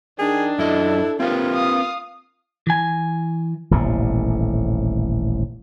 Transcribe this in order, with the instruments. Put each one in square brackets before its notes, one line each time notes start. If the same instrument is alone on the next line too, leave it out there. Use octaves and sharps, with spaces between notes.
[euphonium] D#3 [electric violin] D4 [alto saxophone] G#4
[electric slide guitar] F#2 D#5 [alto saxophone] E4 [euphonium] A4
[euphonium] C3 [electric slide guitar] C4 A#4 B4 [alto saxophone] F4
[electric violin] F5 D#6
[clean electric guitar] E3 G#5
[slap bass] D#1 A1 A2 C3